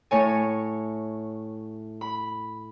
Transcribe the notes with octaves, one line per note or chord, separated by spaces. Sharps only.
A2 C#5 G#5
B5